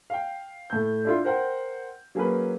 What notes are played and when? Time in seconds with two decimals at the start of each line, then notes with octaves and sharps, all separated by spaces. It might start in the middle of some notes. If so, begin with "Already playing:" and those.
0.10 F5 G5
0.70 A2 G6
1.05 D4 E4 F4
1.25 A#4 C5 F#5 G5
2.15 F#3 A#3 C#4 G#4 A#4 B4